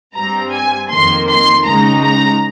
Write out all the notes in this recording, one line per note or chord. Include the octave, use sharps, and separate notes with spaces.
G2 G3 C4 A#5
G#5
F2 D#3 A#3 C6
C6
C#2 C#3 G#3 D#4 A#5
A#5